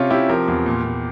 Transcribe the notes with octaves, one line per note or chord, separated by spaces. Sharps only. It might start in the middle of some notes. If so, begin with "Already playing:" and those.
Already playing: C3 C#4 F4
C3 E4 G4
F3 G4 A#4
E2
A#2
A#2